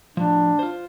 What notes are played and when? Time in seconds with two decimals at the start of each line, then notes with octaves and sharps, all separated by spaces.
0.17 A2 F3 D4
0.59 F4 C5